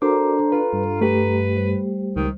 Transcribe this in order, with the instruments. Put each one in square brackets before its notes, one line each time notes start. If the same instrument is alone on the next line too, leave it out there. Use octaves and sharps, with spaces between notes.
[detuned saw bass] D4 [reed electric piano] F#4 A#4 D6 [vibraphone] A4 A#5 [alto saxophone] C5
[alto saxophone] F4 [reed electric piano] B4
[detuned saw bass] G2
[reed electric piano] A3 G4 [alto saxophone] B4
[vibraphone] G3 C5
[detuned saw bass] C#2 [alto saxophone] D#3